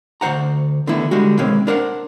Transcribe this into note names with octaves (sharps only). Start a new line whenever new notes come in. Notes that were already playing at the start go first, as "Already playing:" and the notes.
D2 B2 C5 F#5 A#5
D3 D#3 A3 B3 E4
D3 G3 G#3 F#4
B2 D#3 G#3 A#3 C4 C#4
D4 A#4 C5 F#5